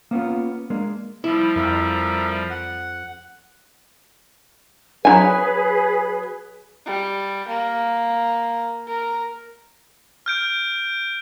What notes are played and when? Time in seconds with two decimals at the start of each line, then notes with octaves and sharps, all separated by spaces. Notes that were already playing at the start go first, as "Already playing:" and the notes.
0.11 A#3 B3 C#4 F4
0.70 G#3 A#3 D4
1.24 F3 G3 E4
1.56 F2 A#4 E5
2.50 F#5
5.05 F#3 E4 G#4 B4 G#5
6.86 G3
7.48 A#3
8.88 A#4
10.26 F6 G6 D7